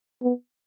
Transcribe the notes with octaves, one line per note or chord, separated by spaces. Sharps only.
B3